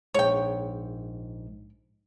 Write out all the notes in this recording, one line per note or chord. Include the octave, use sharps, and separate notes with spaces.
A#1 G#2 C#5 G5